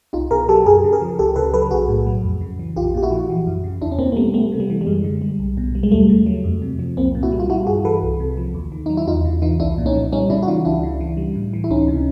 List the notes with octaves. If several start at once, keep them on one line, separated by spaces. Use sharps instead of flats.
C2 D#4 F4
B2 G#4 A#4
F#3 G4 A4
F#2 G#4 A#4
C#3
G#4 A#4
F3
C#2 G4 A4
C#3 A4 B4
F#3 A4 B4
B1 F#4 G#4
A2
F#3
F2
C#3
E3
A#1 F4 G4
A#2 G4
E4 F#4
F3
E3
F#2
C#3
E2 D4 E4
C#4
B2 A#3 C4
A#3
G3 A3 B3
G3 A3 B3
C3
G3
E3
G3
F#2 G#3
D3
G3
B1
B2
G3
G#3
D#2 G3 A3
C#3
F#3
F2
C3
F3
C2 A#3 C4
A#2
E4 F#4
G3
F4
G3 E4 F#4
G2 F#4 G#4
E3 A4 B4
C2
C3
F3
D#2
D#3
F#3 D#4
E4
E2 D#4 F4
C#3
E3 D#4 F4
C2 D4 E4
A#2
C#4 D#4
F3
G3 C#4 D#4
C#3 D4 E4
F#4
E3 D#4 F4
C#2 D4 E4
C#3
E3
G3
A2
E3
E4
C#2 C#4 D#4
C3